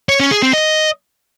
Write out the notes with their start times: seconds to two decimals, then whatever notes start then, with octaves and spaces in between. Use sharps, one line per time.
0.09 C#5
0.20 C#4
0.31 G#4
0.42 C4
0.53 D#5